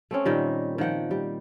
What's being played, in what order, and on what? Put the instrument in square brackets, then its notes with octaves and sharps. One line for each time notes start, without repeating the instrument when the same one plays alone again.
[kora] A3 C4 C#4
A#2 D#3 G3
D#3 F3 F#5 G5
G3